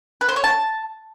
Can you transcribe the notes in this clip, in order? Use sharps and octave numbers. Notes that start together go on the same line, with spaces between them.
B4
C5
C#5
A5